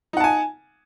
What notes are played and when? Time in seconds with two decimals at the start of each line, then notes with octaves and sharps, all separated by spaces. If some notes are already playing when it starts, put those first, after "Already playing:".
0.13 D#4
0.17 F#5
0.20 A5
0.24 G#5